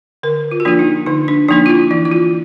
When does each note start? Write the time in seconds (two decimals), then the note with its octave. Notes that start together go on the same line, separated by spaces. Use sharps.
0.23 D3 A#4
0.51 F4
0.60 F#4
0.65 F3 A#3 D4 F4
0.79 D#4
1.06 D3 D#4
1.28 D4
1.48 F3 A#3 D4 D#4
1.66 F4
1.70 E4
1.91 E3 E4
2.05 E4
2.12 F4